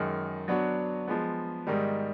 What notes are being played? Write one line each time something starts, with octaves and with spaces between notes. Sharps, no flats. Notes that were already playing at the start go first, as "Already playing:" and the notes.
Already playing: F#2 D#3 G#3
F#3 B3 D4 F#4
F3 G#3 B3
G#2 D#3 G3